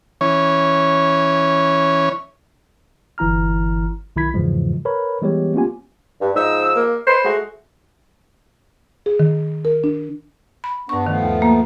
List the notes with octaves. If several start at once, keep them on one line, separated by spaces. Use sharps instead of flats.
E3 C#4 C#5
G1 E3 E4 A#5 F6
B1 D#3 E4 B5 G#6 B6
E2 G#2 C#3 E3 F3 G#3
A#4 B4 C#5 B5
E3 G3 G#3 B3 G4 C#5
A#3 B3 C#4 F4 G4 G#5
G2
G#2 F3 D#4 E6
A#3
B4 C5 B5 C6
G#3 A3 F#4
G#4
D#3
A#4
D4
B5
G2 B3 D4 C#6
D#3 F3 A3 B3
D#2
A#3